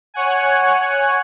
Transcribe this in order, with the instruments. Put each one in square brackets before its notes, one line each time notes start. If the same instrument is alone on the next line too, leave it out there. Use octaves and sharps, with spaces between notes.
[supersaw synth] C#5 F#5 G#5